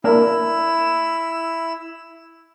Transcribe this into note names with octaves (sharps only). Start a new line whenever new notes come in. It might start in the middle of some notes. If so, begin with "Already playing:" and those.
A#3 D4 E4 A#4 E6